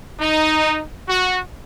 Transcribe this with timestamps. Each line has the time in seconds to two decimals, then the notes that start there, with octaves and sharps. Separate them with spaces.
0.21 D#4
1.09 F#4